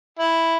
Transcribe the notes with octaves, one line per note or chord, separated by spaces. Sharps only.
E4